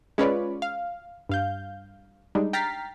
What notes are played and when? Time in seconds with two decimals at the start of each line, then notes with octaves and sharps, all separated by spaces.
0.18 G#3 C#4 F4 B4 C#5 D5
0.62 F5
1.29 G2 F5 G6
2.35 G3 G#3 D4 D#4
2.53 G5 A#5 F6 A6 B6 C7